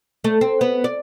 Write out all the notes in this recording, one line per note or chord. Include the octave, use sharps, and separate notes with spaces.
A3
C4
B3
D5